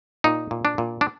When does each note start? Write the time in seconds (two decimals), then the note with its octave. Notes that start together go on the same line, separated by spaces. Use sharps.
0.24 A#2 D#4
0.51 A#2
0.65 D4
0.78 A#2
1.01 D4